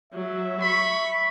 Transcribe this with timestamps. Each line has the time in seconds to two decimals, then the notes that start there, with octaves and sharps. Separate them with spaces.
0.13 F#3 E5
0.61 B5 C#6